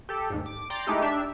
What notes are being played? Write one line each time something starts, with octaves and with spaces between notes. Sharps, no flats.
G4 A4
D#2 G#2
D6
D5 G5 A#5 C6 D6 A6
G#3 A3 D#4 E4 G4
D4 G4 E5